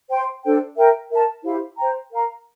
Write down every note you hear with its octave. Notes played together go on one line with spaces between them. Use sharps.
C5 G5 C6
D4 A4 C5 G5
A#4 E5 G5
A#4 E5 A5
E4 G4 C5 F5
C5 G5 A#5
A#4 F5 A#5